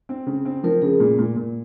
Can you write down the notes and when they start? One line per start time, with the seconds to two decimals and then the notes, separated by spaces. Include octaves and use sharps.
0.09 C4
0.27 C#3
0.45 C4
0.63 F3 A#4
0.82 C#3 G#4
1.00 A#2
1.19 A#2
1.36 A#2